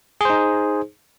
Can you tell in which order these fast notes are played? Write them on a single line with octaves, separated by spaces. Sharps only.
G#4 C5 D#4